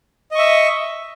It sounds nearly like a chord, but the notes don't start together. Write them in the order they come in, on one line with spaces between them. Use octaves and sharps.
D#5 C#6 E5